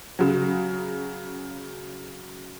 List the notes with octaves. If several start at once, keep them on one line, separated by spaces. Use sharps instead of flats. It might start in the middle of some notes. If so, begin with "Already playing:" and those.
C#3 F#3